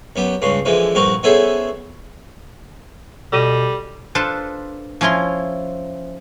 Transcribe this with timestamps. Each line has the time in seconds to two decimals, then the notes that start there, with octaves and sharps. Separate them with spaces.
0.16 F#2 B3 G4
0.42 C#2 G2 C#3 C6
0.65 D3 E3 F3 G#3
0.95 A#1 G2 C4 F#4 A#4
1.23 B3 C#4 E4 G#4 A4 C5
3.33 B2 G3 A4 A#6 D#7
4.15 D4 F4 A4 B4 C5 A5
5.01 F3 C#4 E4 A#5 C6